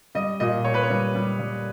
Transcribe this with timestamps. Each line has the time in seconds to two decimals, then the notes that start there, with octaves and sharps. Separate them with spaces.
0.15 G3 D#5
0.40 A#2 D#5
0.64 A#2 C#5
0.74 B4
0.83 C#5
0.90 G3
1.15 G3
1.39 G3